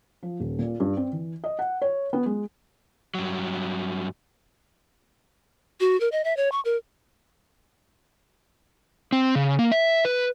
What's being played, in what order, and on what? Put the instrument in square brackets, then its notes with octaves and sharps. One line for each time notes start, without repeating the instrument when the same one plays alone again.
[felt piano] F3
D#1
A#2
G2
C4
E3
D#5
F#5
C#5
B3
G#3
[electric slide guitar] G2 F#3
[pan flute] F#4
A#4
D#5
E5
C#5
C#6
A#4
[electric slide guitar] C4
C#3
A#3
E5
B4